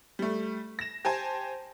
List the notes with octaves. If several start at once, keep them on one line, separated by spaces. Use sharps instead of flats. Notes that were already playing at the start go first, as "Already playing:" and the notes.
G3 A3
A#6 E7
G4 C5 G#5 A5